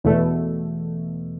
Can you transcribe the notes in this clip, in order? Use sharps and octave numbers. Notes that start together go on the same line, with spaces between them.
E2 B2 A3